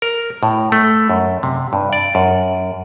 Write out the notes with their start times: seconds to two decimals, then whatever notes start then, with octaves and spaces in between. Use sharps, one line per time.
0.02 A#4
0.43 A2
0.72 A3
1.10 F#2
1.43 C3
1.73 G2
1.93 D5
2.15 F#2